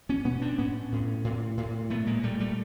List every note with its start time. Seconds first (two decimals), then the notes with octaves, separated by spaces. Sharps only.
0.09 B3 C#4
0.25 B2 B3 C#4
0.41 C4 D4
0.58 A2 B3 C#4
0.92 A2
1.24 A2
1.57 A2
1.90 A#2 A3 B3
2.07 G#3 A#3
2.23 A#2 G3 A3
2.40 G3 A3